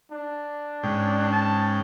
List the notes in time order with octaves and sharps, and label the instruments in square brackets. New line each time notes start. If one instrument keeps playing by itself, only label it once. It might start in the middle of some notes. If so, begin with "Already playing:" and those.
[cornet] D4
[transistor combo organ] G#2 C#3 G5
[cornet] A5